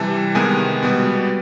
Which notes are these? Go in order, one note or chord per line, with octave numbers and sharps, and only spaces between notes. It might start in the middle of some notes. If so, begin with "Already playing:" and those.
Already playing: C3 E3 G3 A5
C3 D#3 G#3 B3 G#5
B2 G3 B3